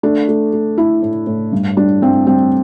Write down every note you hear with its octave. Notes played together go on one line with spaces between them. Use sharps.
A3 D4
A3
A3
A3 E4
A2
A2
G2
G3 D4
G2 C4
G3 C4